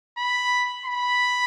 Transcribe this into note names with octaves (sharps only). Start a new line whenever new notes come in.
B5
B5